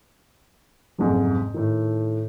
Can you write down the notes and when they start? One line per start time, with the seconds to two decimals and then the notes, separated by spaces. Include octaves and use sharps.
0.98 F#1 F2 G#2 C3
1.54 A2 D#3